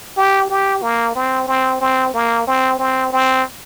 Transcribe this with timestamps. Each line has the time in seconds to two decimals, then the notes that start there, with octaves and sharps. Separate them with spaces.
0.17 G4
0.50 G4
0.82 A#3
1.15 C4
1.48 C4
1.80 C4
2.14 A#3
2.47 C4
2.79 C4
3.13 C4